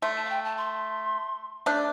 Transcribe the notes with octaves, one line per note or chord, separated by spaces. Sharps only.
A3 C6
A5
F5
G5
A5
C6
A3 D4 D6